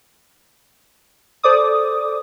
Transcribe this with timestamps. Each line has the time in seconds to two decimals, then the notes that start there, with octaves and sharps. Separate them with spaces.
1.43 A4 C5 D5 D6 D#6